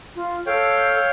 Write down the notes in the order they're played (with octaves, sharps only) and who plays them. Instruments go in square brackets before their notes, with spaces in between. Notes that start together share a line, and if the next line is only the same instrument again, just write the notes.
[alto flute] F4
[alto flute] A4 [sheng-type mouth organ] C#5 F5 G5